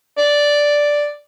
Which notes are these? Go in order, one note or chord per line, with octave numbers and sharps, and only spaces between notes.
D5